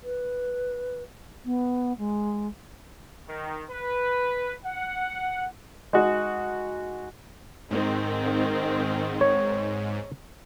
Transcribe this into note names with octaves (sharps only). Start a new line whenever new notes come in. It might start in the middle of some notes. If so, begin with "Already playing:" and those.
B4
B3
G#3
D#3
B4
F#5
G#3 D#4 F#4
G#2 D#3 C4
C#5